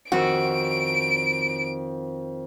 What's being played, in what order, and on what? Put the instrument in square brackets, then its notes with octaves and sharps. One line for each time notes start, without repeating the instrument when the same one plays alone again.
[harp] F2 D#3 E6 [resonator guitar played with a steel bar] F#4 [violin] D7